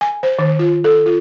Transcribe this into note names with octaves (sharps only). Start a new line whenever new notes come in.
G#5
C5
D#3
F4
A4
F4